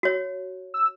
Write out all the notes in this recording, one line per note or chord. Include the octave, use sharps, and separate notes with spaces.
F#4 C#5
E6